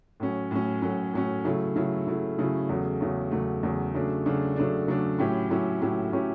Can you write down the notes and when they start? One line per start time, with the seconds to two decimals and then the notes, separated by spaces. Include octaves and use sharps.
0.20 A2 F#3 C#4
0.51 A2 F#3 C#4
0.82 A2 F#3 C#4
1.13 A2 F#3 C#4
1.45 C#3 F#3 A3 E4
1.76 C#3 F#3 A3 E4
2.07 C#3 F#3 A3 E4
2.39 C#3 F#3 A3 E4
2.69 E2 C#3 F#3 A3
3.00 E2 C#3 F#3 A3
3.31 E2 C#3 F#3 A3
3.63 E2 C#3 F#3 A3
3.95 C#3 F#3 A3 D4
4.26 C#3 F#3 A3 D4
4.56 C#3 F#3 A3 D4
4.88 C#3 F#3 A3 D4
5.19 A2 F#3 C#4 E4 G4
5.50 A2 F#3 C#4 E4 G4
5.82 A2 F#3 C#4 E4 G4
6.12 A2 F#3 C#4 E4 G4